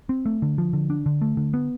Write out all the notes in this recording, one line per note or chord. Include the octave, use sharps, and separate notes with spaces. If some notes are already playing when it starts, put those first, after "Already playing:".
C4
A3
D3
F3
D3
D4
D3
A3
D3
B3